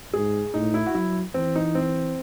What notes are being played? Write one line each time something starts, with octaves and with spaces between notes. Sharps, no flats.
G#2 G#4
A2 D#4
E4
F#4
F#3 E4
E3 C4
D#4
C4